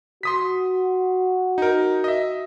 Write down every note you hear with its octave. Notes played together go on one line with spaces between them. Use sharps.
F#4 C6 D#6 B6
D#4 A#4
D#5 E5